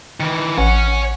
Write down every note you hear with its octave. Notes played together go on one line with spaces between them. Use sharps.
D#3 E3
A1 C#5 F#5 G#5